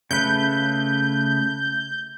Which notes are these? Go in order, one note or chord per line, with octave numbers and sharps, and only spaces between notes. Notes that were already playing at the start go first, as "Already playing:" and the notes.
C#3 A3 B4 G6